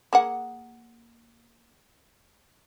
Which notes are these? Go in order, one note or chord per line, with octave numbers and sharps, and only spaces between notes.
A#3 G#4 F#5